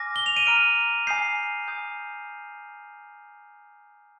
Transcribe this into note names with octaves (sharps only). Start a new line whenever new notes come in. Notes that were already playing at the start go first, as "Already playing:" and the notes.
Already playing: G#5 D6 F6 A#6
G7
F7
D#7
A#5 F6 D7
G#5 D#6 G6 C7
G#5 D#6 G6